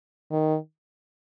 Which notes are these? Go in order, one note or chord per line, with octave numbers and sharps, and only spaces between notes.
D#3